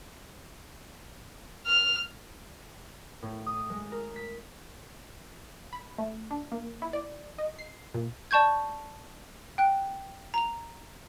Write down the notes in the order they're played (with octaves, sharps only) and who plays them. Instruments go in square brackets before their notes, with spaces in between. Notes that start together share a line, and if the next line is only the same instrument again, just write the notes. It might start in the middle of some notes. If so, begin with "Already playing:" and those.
[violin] F6
[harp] A2
D#6
G#3
A#4
B6
[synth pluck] B5
A3
D4
A#3
E4
D5
D#5
C7
A#2
[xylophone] D5 A5 C#6 G6 G#6
G5 F#6
A#5 F7